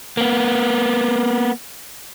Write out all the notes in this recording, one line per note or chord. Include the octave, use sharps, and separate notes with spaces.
A#3 B3